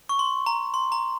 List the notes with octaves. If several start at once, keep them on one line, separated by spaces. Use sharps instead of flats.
C#6
C6
A#5
C6
A#5